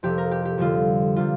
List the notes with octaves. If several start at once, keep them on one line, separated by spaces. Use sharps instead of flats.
F2 C3 F3 G4
A#4
G4
G4
F2 D3 G3 F4
C3 G3 F4